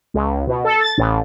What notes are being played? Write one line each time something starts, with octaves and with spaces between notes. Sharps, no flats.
C#2
B2
A4
A6
A1